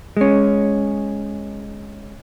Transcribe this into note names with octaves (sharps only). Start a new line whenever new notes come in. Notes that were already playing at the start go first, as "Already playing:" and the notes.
G#3 C#4